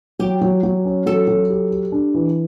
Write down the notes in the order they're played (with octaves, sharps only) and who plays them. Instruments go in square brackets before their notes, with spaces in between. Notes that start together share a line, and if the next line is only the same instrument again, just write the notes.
[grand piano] F#3 [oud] G4
[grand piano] F#3
F#3
C#4
[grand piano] F#3 [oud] A4
[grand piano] F#3
G4
G4
D4
E3